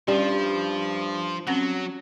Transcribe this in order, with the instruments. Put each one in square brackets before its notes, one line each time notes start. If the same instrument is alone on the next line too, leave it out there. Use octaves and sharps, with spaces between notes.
[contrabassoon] G2 [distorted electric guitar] F3 [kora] G3 [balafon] C#4
[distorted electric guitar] F#3 [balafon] C4 C#4 F#5